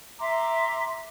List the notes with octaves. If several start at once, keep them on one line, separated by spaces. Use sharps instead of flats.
E5 A#5 C6 D6